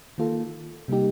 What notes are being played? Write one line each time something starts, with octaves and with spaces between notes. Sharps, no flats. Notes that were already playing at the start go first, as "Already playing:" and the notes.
D#3 A#3 F4 A4
C3 G3 A#3 D#4 G4